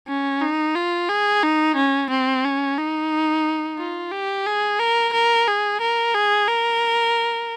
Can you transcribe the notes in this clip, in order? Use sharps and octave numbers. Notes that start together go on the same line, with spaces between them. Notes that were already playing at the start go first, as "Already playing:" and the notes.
C#4
D#4
F4
G#4
D#4
C#4
C4
C#4
D#4
F4
G4
G#4
A#4
A#4
G#4
A#4
G#4
A#4